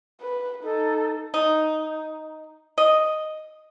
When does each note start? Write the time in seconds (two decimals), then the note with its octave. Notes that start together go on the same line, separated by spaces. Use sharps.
0.21 B4
0.63 D#4 A4
1.34 D#4
2.78 D#5